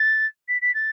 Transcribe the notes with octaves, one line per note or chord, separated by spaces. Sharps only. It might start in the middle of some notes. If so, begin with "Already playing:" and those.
Already playing: A6
B6
B6
A6